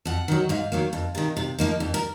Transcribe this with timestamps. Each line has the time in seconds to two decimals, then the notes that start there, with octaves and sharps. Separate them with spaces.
0.05 F2 F#5
0.28 D#3 F#3
0.49 G#2 F5
0.72 D#3 F#3 A#3
0.93 F2
1.15 C3 D#3
1.37 C3
1.59 F3 A#3 D#4
1.80 F2
1.94 A#4